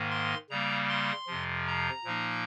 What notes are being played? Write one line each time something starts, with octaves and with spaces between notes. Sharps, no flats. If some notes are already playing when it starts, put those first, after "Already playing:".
Already playing: G#2 D#3 A#3
C6
C#3 G3 A#3 A#5
C6
F2 C3 F3
A#5
A#2 F3 A#3 D#4